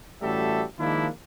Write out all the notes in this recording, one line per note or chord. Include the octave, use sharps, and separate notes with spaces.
A1 G3 A3 F#4 A4 E5
D#3 F3 G#3 A#3 D4 E4